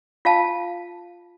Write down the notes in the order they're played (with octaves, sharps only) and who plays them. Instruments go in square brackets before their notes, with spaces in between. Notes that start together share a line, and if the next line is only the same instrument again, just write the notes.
[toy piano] F4 F5 A5